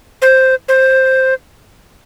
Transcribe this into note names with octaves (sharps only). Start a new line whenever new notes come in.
C5
C5